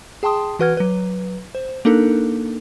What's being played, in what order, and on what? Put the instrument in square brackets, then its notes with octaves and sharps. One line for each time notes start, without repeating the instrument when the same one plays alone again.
[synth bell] G#4 G5 A5 C6 D#6
E3 F#4 B4 F#5 F6 G#6
F#3 B4
C5
A#3 D4 D#4 A4 A#4